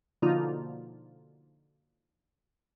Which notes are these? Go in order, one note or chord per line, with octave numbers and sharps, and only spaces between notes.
B2 D3 F3 A#3 D#4 F4